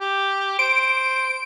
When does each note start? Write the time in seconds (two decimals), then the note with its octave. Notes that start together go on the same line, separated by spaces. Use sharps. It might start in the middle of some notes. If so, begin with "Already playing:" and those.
0.01 G4
0.59 C5 D7